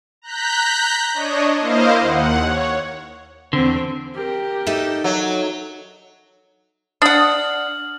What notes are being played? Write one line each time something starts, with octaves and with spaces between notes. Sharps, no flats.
A#5 F#6 G6 B6
D4 C#5 D#5
A#3 E4 C5 D#5 F5
D#2 F#5
C#5
E2 D3 C4
G4 A#4
D#4 A4 E5
F#3
D4 F#5 D#6 F6 F#7